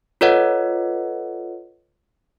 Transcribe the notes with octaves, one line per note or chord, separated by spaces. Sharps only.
F4 A4 B4 C#5 D#5 F#5